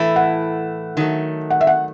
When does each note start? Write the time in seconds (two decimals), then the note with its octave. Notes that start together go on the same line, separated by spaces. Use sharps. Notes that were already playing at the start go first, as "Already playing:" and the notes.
Already playing: A2 E3 A3 E4
0.16 F#5
0.97 D#3 F#3 A3
1.50 F#5
1.61 E5
1.67 F#5